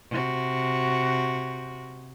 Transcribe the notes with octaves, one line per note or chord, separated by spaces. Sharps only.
C3 F#4